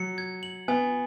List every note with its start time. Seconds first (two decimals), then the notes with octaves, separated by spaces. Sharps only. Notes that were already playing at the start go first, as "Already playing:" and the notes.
Already playing: F#3 C#7
0.18 G#6
0.43 F#7
0.68 B3 G#5